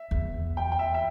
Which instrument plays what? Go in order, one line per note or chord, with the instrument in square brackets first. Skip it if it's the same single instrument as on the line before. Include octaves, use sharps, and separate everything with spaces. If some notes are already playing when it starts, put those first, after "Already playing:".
Already playing: [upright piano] E5
[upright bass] E2
[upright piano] G5
G5
E5
E5